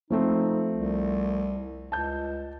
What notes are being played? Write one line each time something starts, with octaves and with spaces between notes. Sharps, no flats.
F3 A3 C4 D#4
C2
C#2 A5 G6